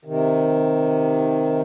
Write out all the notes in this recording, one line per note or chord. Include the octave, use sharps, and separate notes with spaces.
C3 D#3